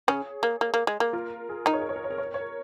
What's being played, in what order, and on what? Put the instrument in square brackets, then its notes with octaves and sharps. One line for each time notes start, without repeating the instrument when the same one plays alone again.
[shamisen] C#3 C#4 [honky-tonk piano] G#4 C#5
[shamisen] A#3
A#3
A#3
G#3
A#3
[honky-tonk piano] F4 A#4
G#4
[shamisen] D#3 D#4 [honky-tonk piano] A#4
[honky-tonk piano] C#5
A#4
C#5
A#4
C#5
A#4
C#5
A#4
C#5
A#4